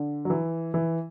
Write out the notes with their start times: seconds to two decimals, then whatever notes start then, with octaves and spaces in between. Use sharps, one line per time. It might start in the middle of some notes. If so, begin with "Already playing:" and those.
Already playing: D3
0.25 F#3
0.30 E3
0.74 E3